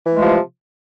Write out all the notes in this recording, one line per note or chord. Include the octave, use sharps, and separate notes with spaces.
C3 E3 F3 G#3 A3